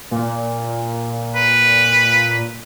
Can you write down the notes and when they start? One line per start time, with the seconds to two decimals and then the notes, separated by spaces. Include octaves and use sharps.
0.11 A#2
1.36 B4